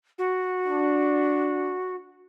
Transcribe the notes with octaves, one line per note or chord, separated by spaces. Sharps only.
F#4
D4